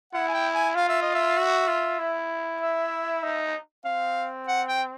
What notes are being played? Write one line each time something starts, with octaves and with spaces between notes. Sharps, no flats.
E4 F#5
G#5
G5
G#5
F4 F5
E5
D#5
E5
F#4
F4
E4
E5
D#4
C4 F5
F#5
G5